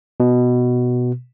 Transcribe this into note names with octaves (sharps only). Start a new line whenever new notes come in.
B2